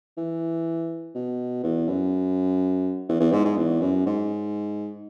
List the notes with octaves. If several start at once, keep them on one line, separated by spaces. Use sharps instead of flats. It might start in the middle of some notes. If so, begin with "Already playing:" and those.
E3
B2
E2
F#2
E2
E2
G#2
G#2
E2
F#2
G#2